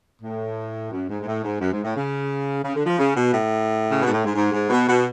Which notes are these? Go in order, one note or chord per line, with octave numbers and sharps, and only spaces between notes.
A2
F#2
G#2
G#2
A2
G#2
F#2
G#2
A2
C#3
C#3
D3
F3
C#3
B2
A2
C#3
B2
G#2
A2
G#2
G#2
G#2
B2
B2